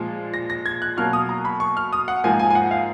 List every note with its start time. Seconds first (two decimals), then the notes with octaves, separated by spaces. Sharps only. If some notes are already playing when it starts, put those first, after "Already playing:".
Already playing: A#2 F3 G#3
0.34 A#6
0.50 A#6
0.66 G#6
0.82 F#6
0.97 B2 F#3 A#3 F6
1.13 D#6
1.29 A#5
1.45 B5
1.60 C#6
1.77 F6
1.93 D#6
2.08 F#5
2.24 G#2 F3 A#3 G#5
2.39 G#5
2.50 G#5
2.55 F#5
2.71 F5